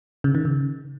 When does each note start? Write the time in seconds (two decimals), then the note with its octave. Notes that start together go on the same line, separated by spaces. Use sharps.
0.24 C#3
0.35 D#3
0.45 C#3